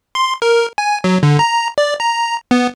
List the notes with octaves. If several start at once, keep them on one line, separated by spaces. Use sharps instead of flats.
C6
A#4
G#5
F#3
D3
A#5
D5
A#5
B3